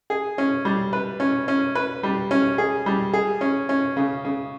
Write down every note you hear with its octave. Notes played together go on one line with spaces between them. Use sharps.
G#4
C#4
G3
B4
C#4
C#4
B4
G3
C#4
G#4
G3
G#4
C#4
C#4
C#3
C#3